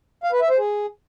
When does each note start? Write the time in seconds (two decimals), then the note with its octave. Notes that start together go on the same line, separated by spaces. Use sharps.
0.24 F5
0.32 B4
0.41 E5
0.50 C5
0.58 G#4